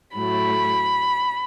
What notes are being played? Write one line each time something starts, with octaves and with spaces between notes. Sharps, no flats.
A2 F#3 A3 B5